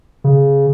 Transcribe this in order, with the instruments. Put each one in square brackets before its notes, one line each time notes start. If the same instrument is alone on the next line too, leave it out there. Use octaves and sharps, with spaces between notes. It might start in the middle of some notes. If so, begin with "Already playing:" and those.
[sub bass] C#3